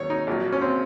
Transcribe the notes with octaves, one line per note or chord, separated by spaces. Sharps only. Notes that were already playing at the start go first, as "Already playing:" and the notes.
Already playing: D#2 D#3 F#3 C#5
D#4
A#1 A#2 F#3
C#4
C4